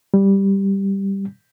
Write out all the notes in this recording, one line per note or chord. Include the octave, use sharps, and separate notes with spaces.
G3